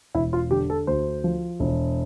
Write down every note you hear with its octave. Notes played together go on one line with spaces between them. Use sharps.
E1 E4
F4
D3 G4
A4
D2 C5
F3
E1